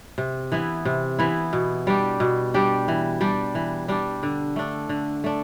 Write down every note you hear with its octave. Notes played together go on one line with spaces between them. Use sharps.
C3
E3 B3 E4
C3
E3 B3 E4
B2
G3 D4 G4
B2
G3 D4 G4
E3
G3 D4 G4
E3
G3 D4 G4
D3
A3 D4
D3
A3 D4